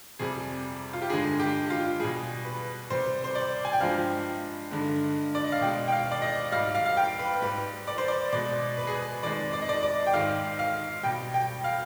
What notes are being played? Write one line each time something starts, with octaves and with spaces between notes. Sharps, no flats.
F2 C3 G3 G#4
F4
G4
G2 D3 G#3 G#4
G4
F4
B2 G3 G#4
B4
C3 G3 C5
C5
D5
G#5
G5
G2 F3 G#3 F5
G2 D3 G#3
D5
D#5
F5
B2 G#3 G5
G5
F5
D5
D#5
G#2 G3 F5
F5
F5
G5
B4
G#2 G3 B4
D5
C5
D5
B2 G#3 D5
B4
G#4
B4
F2 D#3 G#3 D5
D5
D#5
D5
D5
G5
G#2 D#3 G#3 F5
F5
B2 G3 G5
G5
F5